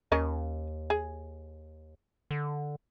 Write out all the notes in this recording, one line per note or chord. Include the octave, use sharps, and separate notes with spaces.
D#2 C#4 A#4 D#5
G#4
D3